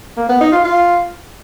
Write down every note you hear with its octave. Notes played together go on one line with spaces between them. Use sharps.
A#3
B3
D#4
F4
F4